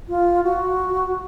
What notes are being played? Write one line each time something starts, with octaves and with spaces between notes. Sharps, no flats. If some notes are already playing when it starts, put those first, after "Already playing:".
F4
F#4